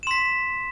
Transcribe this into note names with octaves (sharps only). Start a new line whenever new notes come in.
C6 B6 E7